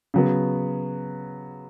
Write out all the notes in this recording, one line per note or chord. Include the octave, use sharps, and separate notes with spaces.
C#3 F#3 B3